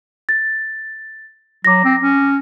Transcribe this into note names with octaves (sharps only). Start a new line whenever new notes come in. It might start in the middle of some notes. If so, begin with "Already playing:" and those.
A6
F#3 D6 A#6
C4
C#4